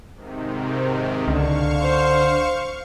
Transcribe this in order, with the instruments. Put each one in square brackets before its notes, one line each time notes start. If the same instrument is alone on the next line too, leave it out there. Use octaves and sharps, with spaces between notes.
[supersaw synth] G#2 C3 D#3
[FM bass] C#2 [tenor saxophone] D3 [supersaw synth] F5 C#6
[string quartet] C5